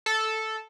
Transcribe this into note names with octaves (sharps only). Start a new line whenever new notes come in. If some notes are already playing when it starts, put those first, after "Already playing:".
A4